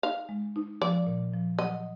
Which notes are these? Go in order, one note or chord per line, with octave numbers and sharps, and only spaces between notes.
D#4 F5
G#3
D#4
F3 D5
A#2
F3
F#3 D#5